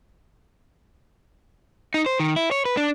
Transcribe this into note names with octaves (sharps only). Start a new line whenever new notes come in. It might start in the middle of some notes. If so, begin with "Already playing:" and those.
D#4
C5
D#3
E4
C#5
B4
D4